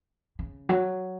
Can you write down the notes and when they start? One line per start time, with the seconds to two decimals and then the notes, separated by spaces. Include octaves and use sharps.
0.39 C#3
0.69 F#3